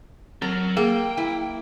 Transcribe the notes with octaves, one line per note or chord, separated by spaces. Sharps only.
F#3 C4 A#4
A#3 G#4 G5
E4